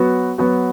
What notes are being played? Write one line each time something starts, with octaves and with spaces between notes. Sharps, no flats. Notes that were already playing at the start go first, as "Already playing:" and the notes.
Already playing: F#3 B3 F#4
F#3 B3 F#4